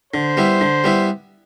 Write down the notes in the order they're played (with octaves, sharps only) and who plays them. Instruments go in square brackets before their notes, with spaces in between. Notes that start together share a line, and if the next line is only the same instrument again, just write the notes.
[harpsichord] D3 [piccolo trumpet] C5
[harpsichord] G3 B3 E4
D3
G3 B3 E4